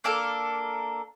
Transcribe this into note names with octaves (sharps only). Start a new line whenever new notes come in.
A#3 D4 A4 A#4